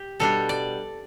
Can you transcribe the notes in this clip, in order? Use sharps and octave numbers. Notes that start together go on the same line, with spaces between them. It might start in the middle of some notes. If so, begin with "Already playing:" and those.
Already playing: G4
B2 G3 D4 A4
D5